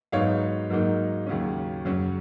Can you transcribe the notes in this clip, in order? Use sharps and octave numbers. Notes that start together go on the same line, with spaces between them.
G#2 F#3 B3 D#4 C#5 F5
G#2 F#3 A#3 D#4
D#2 C#3 F#3 C#4
F#2 C#3 F#3 C#4